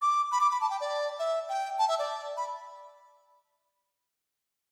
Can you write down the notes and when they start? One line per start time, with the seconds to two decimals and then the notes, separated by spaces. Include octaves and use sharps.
0.02 D6
0.32 B5
0.41 D6
0.51 B5
0.61 A5
0.70 G5
0.80 D5
1.19 E5
1.49 G5
1.78 A5
1.88 E5
1.98 D5
2.37 B5